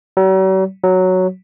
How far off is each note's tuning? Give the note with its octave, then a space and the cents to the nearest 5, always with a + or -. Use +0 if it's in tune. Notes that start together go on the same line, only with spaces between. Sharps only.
F#3 +45
F#3 +0